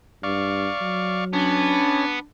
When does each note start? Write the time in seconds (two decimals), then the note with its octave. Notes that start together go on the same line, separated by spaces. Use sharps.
0.23 G2 D5 F5 C#6
0.81 F#3
1.33 B3 C#4 D4